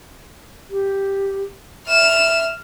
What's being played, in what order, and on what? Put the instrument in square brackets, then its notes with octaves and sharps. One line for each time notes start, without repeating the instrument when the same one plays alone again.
[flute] G4
[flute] E5 [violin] F6 E7